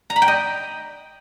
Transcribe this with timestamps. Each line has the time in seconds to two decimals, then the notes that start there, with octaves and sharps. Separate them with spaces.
0.10 A#5
0.16 B5
0.22 G5
0.28 D#5